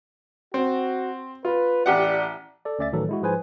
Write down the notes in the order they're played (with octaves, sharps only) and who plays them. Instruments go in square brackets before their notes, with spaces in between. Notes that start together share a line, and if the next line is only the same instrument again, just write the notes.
[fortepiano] C4 [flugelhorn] F#4
[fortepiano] F4 [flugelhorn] B4
[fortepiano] A1 G4 F#5 [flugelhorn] D5
[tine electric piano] A4 D5
D2 C#4 D5 E5 A6
A2 D#3 E3 F#3 A4
G#3 E4 F#4
G#2 F3 G#4 B4 C5 G#5